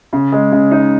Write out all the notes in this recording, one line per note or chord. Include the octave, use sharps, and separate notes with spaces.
C#3
G#3
C#3
D#4